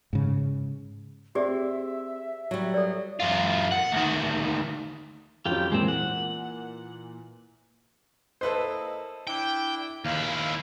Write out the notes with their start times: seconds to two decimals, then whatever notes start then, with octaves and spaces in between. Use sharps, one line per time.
0.13 G#2 C#3
1.35 C4 G4 G#4 D5 E5
2.51 F#3 G3
2.74 A4 D5
3.20 F#2 F4
3.71 F#5
3.92 D2 D#3
5.46 F2 F#3 C#4 F4 G4 G5
5.72 A#2 E3 G#3 C4
5.88 F#5
8.41 A#3 E4 A4 B4 C5 D#5
9.27 D4 E4 G5
10.05 D#2 E4 F5